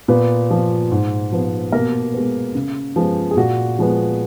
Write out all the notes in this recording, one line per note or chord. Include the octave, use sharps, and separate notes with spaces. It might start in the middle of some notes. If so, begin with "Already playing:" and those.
A#2 B3 B4
F3 B3
G#2
F3 B3
B2 A#3 A#4
G#3 B3
C#3
F3 G#3 B3
G#4
A#2 F#4
F3 G#3 B3